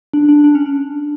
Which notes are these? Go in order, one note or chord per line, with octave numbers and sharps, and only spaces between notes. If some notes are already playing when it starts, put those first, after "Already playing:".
D4
D4
D4
C#4
D4